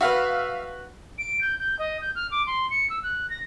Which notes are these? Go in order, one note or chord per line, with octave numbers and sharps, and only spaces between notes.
F#4 B4 E5 F5 F6
D7
G6
G6
D#5
G6
F6
D6
C6
C#7
E6
F#6
A#6